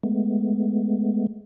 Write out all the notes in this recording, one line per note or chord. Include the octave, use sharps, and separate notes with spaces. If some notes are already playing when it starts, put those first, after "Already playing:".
G#3 A3 B3